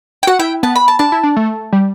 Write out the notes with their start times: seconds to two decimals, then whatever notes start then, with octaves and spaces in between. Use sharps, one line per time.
0.23 G5
0.27 F#4 F#5
0.39 E4 G5
0.63 B3 A5
0.76 B5
0.88 A5
0.99 D4 A5
1.12 E4
1.23 D4
1.36 A3
1.73 G3